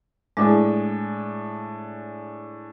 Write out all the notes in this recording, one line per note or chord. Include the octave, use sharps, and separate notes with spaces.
A2 G#3 D4 G#4 D6